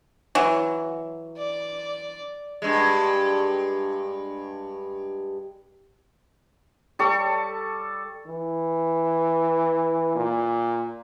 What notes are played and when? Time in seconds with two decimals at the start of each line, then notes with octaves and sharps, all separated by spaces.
0.35 E3 F#3
1.37 D5
2.62 G2 G#3
6.99 G3 A4 C#6
8.26 E3
10.15 A#2